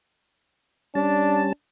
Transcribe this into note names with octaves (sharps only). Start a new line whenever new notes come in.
G3 C#4 D4 A5